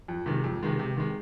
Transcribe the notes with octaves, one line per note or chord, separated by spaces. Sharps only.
F2
C3 D#3 G#3
F2
C3 D#3 G#3
C3
D#3 G#3